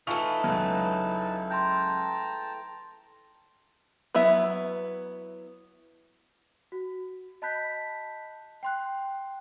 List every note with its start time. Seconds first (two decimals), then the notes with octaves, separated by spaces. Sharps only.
0.07 E3 A3 D#4 F4 B4 A5 C#6 F7
0.44 C#2 F#3
1.50 G5 A5 A#5 C6 G6
4.15 F#3 B3 E4 E5
6.72 F#4
7.42 D#5 A5 B5 F#6 G6 B6
8.63 G5 C6 F#6